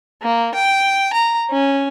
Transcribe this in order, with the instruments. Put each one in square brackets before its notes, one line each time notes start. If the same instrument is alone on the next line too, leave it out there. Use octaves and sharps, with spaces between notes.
[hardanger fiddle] A#3
G5
A#5
C#4